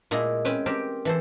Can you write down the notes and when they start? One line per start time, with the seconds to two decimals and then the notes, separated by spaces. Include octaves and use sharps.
0.11 A#2 G#3 E4 A#5
0.45 C4 C#4 B4
0.66 C4 G4 A#4
1.05 E3 A4 C5